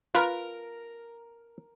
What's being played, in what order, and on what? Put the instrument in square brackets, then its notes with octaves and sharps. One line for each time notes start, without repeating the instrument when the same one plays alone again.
[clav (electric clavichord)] F4 B4 [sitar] A#4